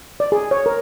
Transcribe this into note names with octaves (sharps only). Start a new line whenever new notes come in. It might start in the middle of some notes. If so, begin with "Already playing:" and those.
D5
G#4
C#5
A#4